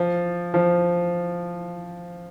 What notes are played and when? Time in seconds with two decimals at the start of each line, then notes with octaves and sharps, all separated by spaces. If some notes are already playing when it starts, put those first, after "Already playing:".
Already playing: F3
0.54 F3